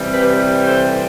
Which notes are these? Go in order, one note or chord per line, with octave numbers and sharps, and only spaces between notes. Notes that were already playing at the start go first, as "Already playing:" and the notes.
Already playing: C3 E3 G3
G4 B4
A4 C5